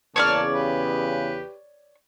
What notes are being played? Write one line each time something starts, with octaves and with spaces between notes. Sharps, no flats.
E2 C#3 A#3 C#5 D5 A5 F6
G4 B4